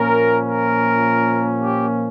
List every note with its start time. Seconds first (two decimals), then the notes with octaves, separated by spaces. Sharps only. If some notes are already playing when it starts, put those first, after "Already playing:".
Already playing: A#2 F3 A#3 C#4 A#4
0.45 A#4
1.60 G4